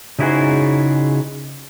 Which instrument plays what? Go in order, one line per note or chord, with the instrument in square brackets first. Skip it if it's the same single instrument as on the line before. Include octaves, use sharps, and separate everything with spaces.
[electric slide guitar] C#3 D#4 E4 F#4 G#4 C5